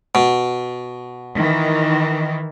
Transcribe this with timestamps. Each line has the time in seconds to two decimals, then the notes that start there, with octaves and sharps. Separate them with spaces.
0.15 B2
1.36 D#3 E3